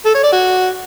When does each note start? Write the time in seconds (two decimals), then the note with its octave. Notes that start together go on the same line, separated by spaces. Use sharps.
0.05 A4
0.14 C#5
0.23 D5
0.32 F#4